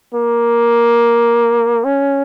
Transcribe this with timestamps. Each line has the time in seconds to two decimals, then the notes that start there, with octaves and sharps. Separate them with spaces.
0.14 A#3
1.84 C#4